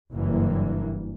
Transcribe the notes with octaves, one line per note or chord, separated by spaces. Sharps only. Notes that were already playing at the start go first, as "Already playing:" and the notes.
F#1 G2 E3 A#3